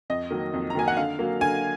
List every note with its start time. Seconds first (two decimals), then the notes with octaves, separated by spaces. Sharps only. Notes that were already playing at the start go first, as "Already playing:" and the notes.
0.10 F2 D#5
0.31 D#3 F#3 A#3
0.54 F2
0.70 A#5
0.75 D#3 F#3 A#3 G#5
0.88 F#5
0.97 D3 F5
1.19 F#3 A#3
1.41 D3 G#5